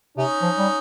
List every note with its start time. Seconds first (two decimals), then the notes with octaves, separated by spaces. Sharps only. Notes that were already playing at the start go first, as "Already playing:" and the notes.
0.17 C3 C#4 D#4
0.42 F3
0.59 G3